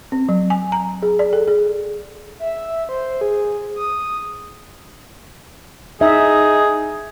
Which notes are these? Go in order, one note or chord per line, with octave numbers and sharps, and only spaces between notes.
C4
F#3
G#5
A#5
G#4
D5
A4
G#4
E5
C5
G#4
D#6
D#4 G#4 E5